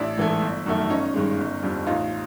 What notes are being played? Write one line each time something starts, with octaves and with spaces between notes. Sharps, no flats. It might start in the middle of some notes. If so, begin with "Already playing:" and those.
Already playing: A1 D4 E4
G#2 E3 A3
G1
F#2 D#3 F#3 A3
G1 C#4 D#4
G2 D#3 G#3
G1
F2 D3 G3
A1 D#4 F4